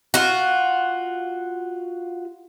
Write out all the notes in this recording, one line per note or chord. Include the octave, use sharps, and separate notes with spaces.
F4 F#4